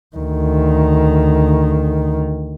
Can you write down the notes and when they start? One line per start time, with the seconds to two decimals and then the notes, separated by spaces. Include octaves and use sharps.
0.16 D2 D#3